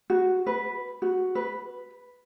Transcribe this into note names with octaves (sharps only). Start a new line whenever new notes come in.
F#4
B4
F#4
B4